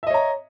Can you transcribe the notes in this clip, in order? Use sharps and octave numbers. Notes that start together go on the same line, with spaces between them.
C#5 D#5 E5 A#5